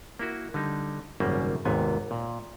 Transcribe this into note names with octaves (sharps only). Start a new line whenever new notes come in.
A#3 E4 F#4
D3 G3 D#4
G#1 F#2 C#3 G3 A#3
G#1 D#2 G#2 C3 B3 G#5
A#2